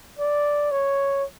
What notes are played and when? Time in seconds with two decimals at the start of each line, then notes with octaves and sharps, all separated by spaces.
0.19 D5
0.71 C#5